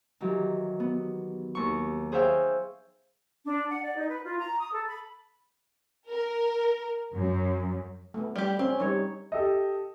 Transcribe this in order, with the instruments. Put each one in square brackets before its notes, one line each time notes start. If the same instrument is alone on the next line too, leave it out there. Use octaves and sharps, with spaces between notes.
[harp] D#3 E3 F#3 G4
B3
D#2 C#6
G#4 C5 C#5 E5 F5 G5
[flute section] D4
F#5
D5
D#4
B4
F4
A#5
D#6
A4
B5
[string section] A#4
F#2
[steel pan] A3 B3
[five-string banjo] G3 G4
[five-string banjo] C4 [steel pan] C#4
[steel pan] G3 D#4 C#5
[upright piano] G4 A4 D#5